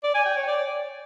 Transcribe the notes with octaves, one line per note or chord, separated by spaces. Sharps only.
D5
G#5
G5
C#5
D5